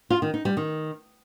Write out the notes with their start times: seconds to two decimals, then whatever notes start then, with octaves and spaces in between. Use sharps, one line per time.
0.10 F4
0.22 D#3
0.34 D#4
0.45 G3
0.57 D#3